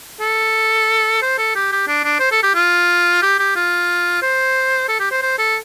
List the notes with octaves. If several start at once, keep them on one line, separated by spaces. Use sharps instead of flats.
A4
C5
A4
G4
G4
D4
D4
C5
A4
G4
F4
G4
G4
F4
C5
A4
G4
C5
C5
A4